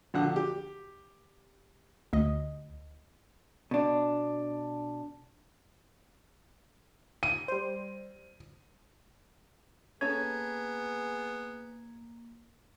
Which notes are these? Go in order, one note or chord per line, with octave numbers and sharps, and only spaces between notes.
A#1 D3 F#5
G4
D2 D#5
B2 D4
D#7
G3 C5
A#3 B3 C#4 G#4 A4 G#6